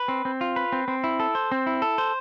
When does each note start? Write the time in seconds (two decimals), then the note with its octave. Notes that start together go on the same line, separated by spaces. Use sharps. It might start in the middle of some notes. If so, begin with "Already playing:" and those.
Already playing: B4
0.08 C4
0.25 C4
0.41 F4
0.56 B4
0.72 C4
0.88 C4
1.04 E4
1.20 A4
1.35 C5
1.52 C4
1.66 E4
1.82 A4
1.98 C5